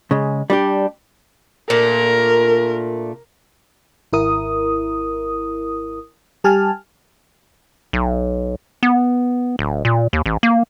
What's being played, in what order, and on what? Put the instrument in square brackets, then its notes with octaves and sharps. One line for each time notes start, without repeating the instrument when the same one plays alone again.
[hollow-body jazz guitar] C#3 G#3
G3 D4 G4
[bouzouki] A#2 A3 D4 [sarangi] A#4
[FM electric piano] G#1 E4 A#4 D#6
G3 G4 G#5 A5 F6
[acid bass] B1
B3
D1
A#2
D#2
A1
A#3